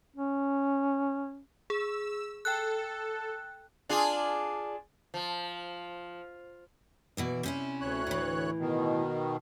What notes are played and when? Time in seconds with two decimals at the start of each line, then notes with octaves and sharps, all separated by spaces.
0.16 C#4
1.70 G#4 E6
2.45 A4 G5 F#6
3.89 D4 F4 G#4
5.14 F3
7.17 B2 E3 D5
7.43 C3 C#4 E4
7.81 D2 C#5 F#6
8.07 A2 E3
8.59 B2 D#3